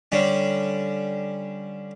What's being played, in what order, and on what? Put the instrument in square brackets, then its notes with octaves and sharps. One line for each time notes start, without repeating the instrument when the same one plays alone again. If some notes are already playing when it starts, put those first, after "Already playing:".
[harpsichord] D3 G3 C#4